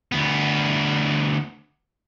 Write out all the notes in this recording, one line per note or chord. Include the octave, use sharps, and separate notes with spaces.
D2 B3